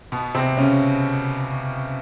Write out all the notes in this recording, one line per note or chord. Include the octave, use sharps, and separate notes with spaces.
B2 B3
C3 C4
C#3 C#4